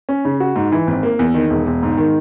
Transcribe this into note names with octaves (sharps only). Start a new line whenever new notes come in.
C#4
C#3
F#4
G#2
E3
G#1
A#3
E2
D#3
E1
E1
G#2
D#3